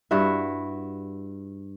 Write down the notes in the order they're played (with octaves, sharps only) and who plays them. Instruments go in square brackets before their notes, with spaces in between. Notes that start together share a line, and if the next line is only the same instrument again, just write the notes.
[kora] G2 E4 F#4 E5